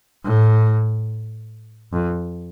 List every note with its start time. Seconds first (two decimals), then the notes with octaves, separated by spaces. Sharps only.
0.25 A2
1.93 F2